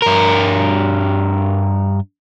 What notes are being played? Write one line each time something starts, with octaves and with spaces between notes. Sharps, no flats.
G2 A#4